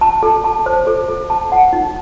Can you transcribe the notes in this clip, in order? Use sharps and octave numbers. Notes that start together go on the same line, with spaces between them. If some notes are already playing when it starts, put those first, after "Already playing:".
A5
A4
A5
C5
A4
A4
A5
F#5
D#4